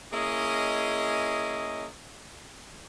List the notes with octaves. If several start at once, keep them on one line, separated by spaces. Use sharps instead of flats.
A#3 C#4 E4 G#4 D#5